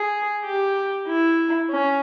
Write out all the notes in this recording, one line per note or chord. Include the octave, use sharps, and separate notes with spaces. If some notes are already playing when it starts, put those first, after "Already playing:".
Already playing: G#4
G4
E4
C#4